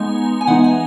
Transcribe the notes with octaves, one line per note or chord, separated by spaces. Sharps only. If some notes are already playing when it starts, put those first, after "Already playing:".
Already playing: G#3 B3 D#4 G#5
G#5
E3 G#3 B3 D#4 F#5
G#5